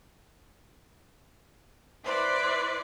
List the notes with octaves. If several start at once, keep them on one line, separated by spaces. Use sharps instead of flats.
E4 B4 C5 D5